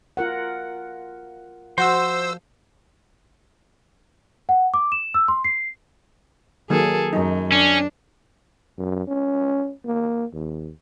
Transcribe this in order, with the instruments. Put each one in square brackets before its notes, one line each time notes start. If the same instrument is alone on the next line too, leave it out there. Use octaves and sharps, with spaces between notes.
[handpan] F4 A#4 F#5
[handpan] F3 [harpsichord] F#4 F#5 [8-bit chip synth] C5 E6 [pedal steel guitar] C6
[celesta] F#5
D6
E7
E6
C6
C7
[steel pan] D#3 F#3 A#3 [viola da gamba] G#4 A4
[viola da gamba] F#2 [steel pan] D#4
[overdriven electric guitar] C#4 [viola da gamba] D4
[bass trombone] F#2
C#4
A#3
D#2